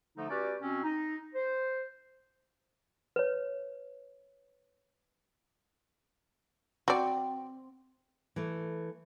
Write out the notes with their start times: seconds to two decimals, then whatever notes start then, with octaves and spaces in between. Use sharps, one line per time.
0.18 D3 F3 A3 D#4
0.30 C#4 F#4 G4 B4 D5
0.62 B2 C4 C#4
0.84 D#4
1.35 C5
3.16 B4 C#5
6.88 C4 F#4 D5
8.36 E3 A3